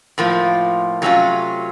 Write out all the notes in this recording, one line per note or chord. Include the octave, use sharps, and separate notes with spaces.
A2 F3 A#3 F4
C3 F#3 A3 C#4 F4